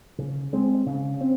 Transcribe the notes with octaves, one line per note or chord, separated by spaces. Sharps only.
C#3
G#3 C4
C#3
C4